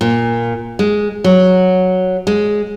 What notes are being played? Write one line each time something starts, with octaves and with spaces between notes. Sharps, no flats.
A#2
G#3
F#3
G#3